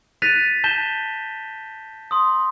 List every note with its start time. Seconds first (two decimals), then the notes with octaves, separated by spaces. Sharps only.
0.22 F#6 A6 B6 D#7 F7
0.64 A5 G6 A#6 E7 G7
2.11 C6 D#6